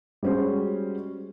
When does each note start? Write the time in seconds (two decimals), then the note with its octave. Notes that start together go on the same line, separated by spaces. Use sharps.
0.23 G3 G#3 C#4 F#4 C5